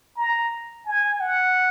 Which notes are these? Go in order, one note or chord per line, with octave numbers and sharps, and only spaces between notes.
A#5
G#5
F#5